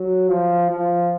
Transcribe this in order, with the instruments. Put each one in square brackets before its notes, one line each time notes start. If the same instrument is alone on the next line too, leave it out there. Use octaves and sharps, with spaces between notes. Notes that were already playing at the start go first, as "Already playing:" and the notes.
Already playing: [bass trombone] F#3
F3
F3